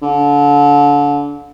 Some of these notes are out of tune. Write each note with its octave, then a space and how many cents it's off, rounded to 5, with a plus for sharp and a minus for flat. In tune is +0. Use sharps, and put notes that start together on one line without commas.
D3 -30